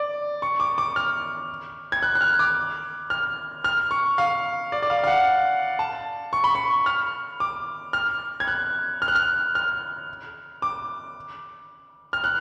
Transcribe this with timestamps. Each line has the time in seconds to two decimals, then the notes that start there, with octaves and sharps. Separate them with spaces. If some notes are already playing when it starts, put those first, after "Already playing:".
Already playing: D5
0.42 C#6
0.60 D6
0.78 D6
0.96 F6
1.92 G#6
2.03 F#6
2.15 F#6
2.21 F6
2.39 D6
3.10 F6
3.64 F6
3.91 C#6
4.18 F5
4.72 D5
4.82 D5
4.90 F5
5.04 F5
5.07 F#5
5.79 A5
6.33 C#6
6.44 B5
6.55 C#6
6.86 F6
7.40 D6
7.93 F6
8.40 G#6
8.48 F#6
9.02 F6
9.08 F#6
9.15 F6
9.55 F6
10.62 D6
12.13 F6
12.24 F#6